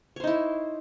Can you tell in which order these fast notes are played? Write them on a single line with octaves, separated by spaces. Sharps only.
C#5 C5 D#4 E4